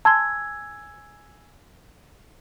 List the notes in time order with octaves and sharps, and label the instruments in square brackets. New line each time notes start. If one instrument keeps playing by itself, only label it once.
[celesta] G#5 E6 G#6 [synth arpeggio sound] A5 C6